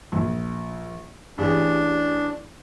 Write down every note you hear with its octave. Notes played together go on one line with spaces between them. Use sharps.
A#1
A1 D4 G4 G#4